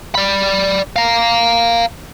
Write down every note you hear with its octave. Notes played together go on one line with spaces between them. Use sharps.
D5 B5
F5 A#5